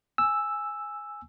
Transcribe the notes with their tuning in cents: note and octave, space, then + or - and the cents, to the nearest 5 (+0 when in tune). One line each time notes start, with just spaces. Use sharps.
G#5 +0 E6 +0